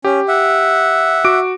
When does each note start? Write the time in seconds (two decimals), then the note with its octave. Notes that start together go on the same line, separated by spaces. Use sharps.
0.05 C#4 G4
0.28 E5 F#5
1.25 F#4 D6 D7